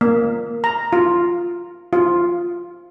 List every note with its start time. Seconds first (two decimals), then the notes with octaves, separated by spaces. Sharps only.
0.01 A#3
0.64 A#5
0.93 F4
1.93 F4